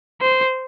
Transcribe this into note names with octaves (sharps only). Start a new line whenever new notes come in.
C5